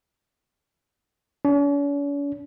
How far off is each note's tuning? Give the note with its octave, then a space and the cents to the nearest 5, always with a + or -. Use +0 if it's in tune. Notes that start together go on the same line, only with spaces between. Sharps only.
C#4 +45